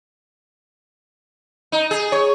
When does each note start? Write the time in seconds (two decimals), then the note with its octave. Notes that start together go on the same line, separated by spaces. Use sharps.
1.72 D#4
1.91 G#4
2.12 C#5